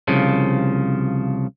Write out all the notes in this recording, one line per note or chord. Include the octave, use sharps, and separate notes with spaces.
C2 C#3 F3